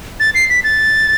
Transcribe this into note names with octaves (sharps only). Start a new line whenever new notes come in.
A6
C7
B6
A6